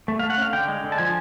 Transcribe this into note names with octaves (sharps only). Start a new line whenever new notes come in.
A3
A3 F5
F#5
C#4 F5
D3 G5
G#3
D3
A5
F3 G#5